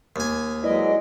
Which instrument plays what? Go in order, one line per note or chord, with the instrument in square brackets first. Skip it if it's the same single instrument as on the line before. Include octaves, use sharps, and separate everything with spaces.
[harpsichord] D#2 G#5
[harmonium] F#3 G#3 D#5 [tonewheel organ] E4 B4 D5